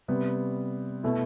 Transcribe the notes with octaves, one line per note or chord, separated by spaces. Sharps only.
C3 G3 B3
B2 A3 E4